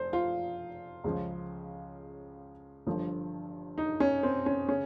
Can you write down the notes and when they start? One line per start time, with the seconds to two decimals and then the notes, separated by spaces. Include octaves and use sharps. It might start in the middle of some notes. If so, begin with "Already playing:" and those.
Already playing: F1 C5
0.13 F4
1.04 C#2 C#3 F3
2.87 G1 G2 F3
3.78 D#4
4.00 C#4
4.23 C4
4.46 C#4
4.69 C#3 C#4